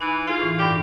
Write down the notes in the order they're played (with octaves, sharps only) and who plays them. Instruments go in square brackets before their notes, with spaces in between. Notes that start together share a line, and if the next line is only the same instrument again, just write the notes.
[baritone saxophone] E3 [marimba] D#4 G#5 B5
[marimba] E4 G#4 A4 [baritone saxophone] F4
[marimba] A2 E3
[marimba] G2 D4 D5 [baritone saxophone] G4